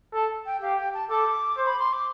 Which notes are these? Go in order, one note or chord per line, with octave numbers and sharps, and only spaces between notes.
A4 A5
G5
G4 F5
G5
A5
A4 D6
C5
B5
C6
D6